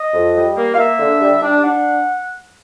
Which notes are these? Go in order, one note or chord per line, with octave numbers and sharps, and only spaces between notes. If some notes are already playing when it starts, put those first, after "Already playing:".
Already playing: D#5
F2
G3
A#3
F5
A#3 E5
D3
G3
D4
D4 F#5